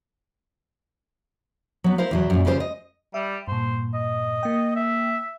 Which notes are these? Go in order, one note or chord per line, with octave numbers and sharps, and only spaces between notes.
F#3 B3
E4 A#4 C5 F5
E2 B2 F#3
F#2 A#2
C#3 G3 C#4 E4 F4 C5
D#5
G3 E5
G2 A#2 C5
D#5
A#3 G5
E5